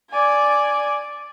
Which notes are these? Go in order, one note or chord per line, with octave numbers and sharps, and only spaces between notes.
D5 G#5